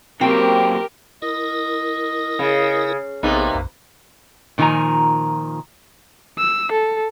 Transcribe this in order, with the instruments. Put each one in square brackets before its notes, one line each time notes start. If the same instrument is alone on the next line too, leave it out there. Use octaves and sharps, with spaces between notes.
[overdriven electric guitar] F#3 A#3 [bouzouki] C4 [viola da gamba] G4 A#4
[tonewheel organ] E4 A#4 [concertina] D#5
[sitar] C#3
[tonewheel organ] A#1 B3 G#4 [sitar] C3 D#4 [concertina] A#3 B4
[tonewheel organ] B1 F#2
[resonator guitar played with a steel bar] A#2 D#3 F3 G#5 A#5
[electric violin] E6
A4